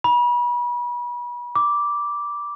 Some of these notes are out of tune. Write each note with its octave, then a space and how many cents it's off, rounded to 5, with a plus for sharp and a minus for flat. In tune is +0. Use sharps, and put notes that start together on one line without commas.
B5 -35
D6 -5